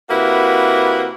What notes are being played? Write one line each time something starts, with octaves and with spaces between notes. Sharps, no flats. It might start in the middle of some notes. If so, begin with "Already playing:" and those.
C3 A#3 E4 F#4 B4